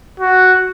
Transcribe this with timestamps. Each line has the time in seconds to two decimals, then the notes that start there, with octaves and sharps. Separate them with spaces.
0.20 F#4